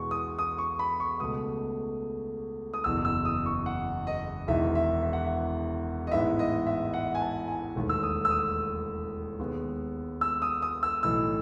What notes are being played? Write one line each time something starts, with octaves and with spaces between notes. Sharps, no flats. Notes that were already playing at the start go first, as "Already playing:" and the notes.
Already playing: E2 B2 G#3 B3 C#6
D#6
D#6
C#6
B5
C#6
C#2 B2 A3 D#6
D#6
F#1 E2 B2 E6
E6
D#6
C#6
F#5
D#5
E1 E2 D#3 E5
E5
E5
F#5
E5
D#5
A1 G#2 E3 B3 E5
D#5
E5
F#5
G#5
A5
G#5
E1 D#2 D#3 A3
E6
D#6
E6
D#6
D#2 D#3 G#3 B3
E6
D#6
D#6
E6
B1 A2 E3 A3 E6